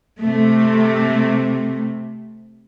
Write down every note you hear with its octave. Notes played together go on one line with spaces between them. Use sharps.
C3 A3